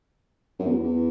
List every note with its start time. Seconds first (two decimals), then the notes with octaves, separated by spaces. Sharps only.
0.59 F#2
0.67 E2
0.84 E2